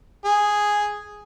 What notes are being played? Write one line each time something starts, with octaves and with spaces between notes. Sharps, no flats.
G#4